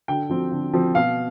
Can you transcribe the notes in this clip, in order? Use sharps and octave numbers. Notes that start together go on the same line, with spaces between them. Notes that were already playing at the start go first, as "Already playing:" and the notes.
D3 G5
F3 C4
D3
F3 C4
B2 F5